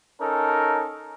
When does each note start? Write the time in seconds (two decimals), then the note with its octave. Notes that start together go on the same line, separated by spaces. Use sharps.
0.20 C#4 D#4 A4 A#4